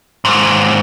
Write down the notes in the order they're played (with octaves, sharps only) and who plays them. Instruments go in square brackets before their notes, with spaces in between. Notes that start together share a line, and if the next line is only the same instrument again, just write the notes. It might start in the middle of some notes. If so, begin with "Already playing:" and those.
[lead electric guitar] D#2 G#2